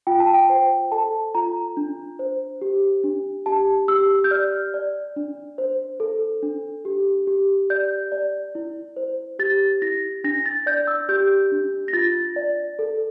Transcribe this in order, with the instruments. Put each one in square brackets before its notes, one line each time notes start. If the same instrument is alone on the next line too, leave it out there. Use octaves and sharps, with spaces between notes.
[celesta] F4 G5
A5
G5
C5
A4 A5
F4 A#5
D4
C5
G4
D4
G4 A5
G4 E6
G6
D5 F6
D5
D4
C5
A4
D4
G4
G4
D5 G6
D5
E4
C5
G4 A6
E4 A#6
D4 A#6
A6
D5 G6
E6
G4 G6
D4
A#6
F4 A6
D5
A4